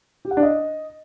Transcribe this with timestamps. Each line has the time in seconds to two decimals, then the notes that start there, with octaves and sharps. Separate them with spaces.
0.25 G4
0.31 F#5
0.37 D4
0.43 D#5